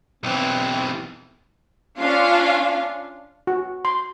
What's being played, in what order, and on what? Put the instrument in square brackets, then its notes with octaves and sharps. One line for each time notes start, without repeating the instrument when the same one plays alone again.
[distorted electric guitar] B1 E3 [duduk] C4
[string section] C#4 D4 F4 F5
[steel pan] F#4
C6